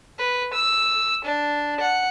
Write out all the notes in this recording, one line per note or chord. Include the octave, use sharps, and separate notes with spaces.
B4
E6
D4
F#5